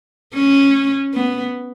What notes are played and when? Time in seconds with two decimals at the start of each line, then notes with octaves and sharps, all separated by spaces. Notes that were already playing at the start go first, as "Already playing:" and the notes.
0.34 C#4
1.14 B3